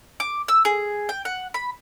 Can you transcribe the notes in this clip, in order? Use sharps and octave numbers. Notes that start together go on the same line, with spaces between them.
D6
E6
G#4
G5
F#5
B5